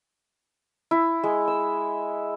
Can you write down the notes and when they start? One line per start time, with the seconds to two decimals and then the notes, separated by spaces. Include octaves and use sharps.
0.91 E4
1.24 G#3
1.48 E6